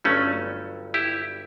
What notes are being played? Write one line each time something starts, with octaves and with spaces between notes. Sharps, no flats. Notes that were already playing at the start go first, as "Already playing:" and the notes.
G1 G2 F#3 A3 C#4
E4 G4